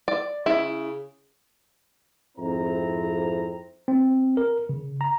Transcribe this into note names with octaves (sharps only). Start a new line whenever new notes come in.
D5
C#3 E4
F2 G#2 C4 E4 C5 A#5
C4
A#4
C#3
A#5